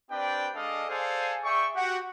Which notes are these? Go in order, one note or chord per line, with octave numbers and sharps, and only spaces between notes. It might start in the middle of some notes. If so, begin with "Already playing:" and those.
C4 D4 G4 B4 D5 G5
G#3 D4 A4 D5 D#5 F5
G#4 A4 C5 D5 F5 G#5
G#4 D5 E5 G5 C#6
F#4 G4 F#5